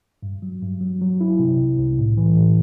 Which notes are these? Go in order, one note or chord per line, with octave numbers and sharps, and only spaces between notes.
G2
F#3
G2
F#3
F#3
E4
C3
C2
C2
A2
E3
A2